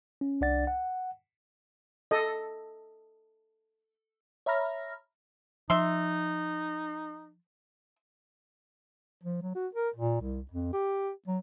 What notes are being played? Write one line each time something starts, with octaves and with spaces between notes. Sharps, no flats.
C#4
C2 D4 D5 F#5 A6
F#5
A4 D#5
C#5 E5 A#5 B5 F6 A#6
F3 D#4 E5 C6
F3
F#3
F#4
A#4
A#2
C2
F2
G4
F#3